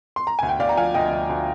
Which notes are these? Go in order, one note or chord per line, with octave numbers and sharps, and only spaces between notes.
C6
A#5
D2 G#5
G5
D2 D5 F5
A#5
F3 F5 G#5
D2 D#5 G5
D2
D2